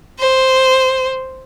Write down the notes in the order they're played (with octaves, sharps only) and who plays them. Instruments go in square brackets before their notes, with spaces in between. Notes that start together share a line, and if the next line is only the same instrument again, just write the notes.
[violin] C5